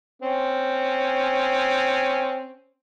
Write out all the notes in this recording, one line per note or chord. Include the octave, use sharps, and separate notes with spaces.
C4 C#4